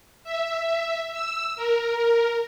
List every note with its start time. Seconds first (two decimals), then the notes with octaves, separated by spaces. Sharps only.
0.24 E5
1.11 E6
1.56 A#4